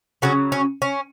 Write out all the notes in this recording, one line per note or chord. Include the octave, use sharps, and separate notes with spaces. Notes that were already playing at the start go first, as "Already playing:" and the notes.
C#3 F#3 C#4 F#4
C#4
C#4